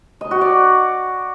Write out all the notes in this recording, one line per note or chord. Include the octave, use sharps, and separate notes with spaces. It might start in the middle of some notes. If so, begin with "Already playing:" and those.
D#5
F#4
D5